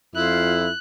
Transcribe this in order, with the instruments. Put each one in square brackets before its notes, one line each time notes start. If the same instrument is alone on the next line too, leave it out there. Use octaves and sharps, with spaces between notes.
[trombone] F2 [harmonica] E4 [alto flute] F4 [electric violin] F#6